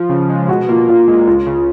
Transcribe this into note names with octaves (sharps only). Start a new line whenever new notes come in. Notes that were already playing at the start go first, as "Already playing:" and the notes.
Already playing: F3 F4
C#3
G#3
B2 F#4
A#3 F4
A#2 F4
G#3
C#2 F4
C#3